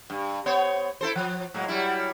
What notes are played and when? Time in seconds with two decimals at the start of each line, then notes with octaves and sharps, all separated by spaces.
0.10 G2
0.46 B3 C5 C#5
1.01 E4 A4 C5
1.16 F3
1.54 A2 F#3 G#3
1.68 F#3 G3 E4